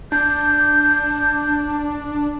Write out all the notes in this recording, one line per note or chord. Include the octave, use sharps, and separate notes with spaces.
D4 G6